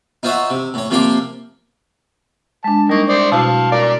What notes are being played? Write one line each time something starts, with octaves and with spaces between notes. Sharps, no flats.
D#4 F4 C5 C#5 E5 F#5
C3
A2 C#5
C3 F3 A#3 G5 C6 D6
G#3 D4 A5
G3 A#3 D#4 C#6
C5 D5 D#6
B2 E4 F#4 F5 A5
A#4 D5